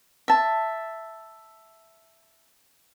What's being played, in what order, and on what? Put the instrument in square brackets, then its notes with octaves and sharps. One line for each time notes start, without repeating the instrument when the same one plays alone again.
[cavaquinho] E5 A5